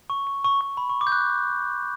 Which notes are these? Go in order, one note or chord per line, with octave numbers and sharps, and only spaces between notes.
C#6
C#6
C#6
C#6
B5
C#6
D6
G6
F#6